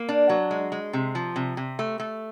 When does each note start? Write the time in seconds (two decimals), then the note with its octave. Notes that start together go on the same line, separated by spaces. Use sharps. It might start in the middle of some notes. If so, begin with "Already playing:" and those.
Already playing: A#3
0.09 D4
0.29 F#3
0.51 G#3
0.72 G#3
0.93 C3
1.15 F3
1.36 C3
1.57 C3
1.79 A3
2.00 A3